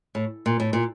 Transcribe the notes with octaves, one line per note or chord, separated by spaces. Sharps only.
A2
A#2
A2
A#2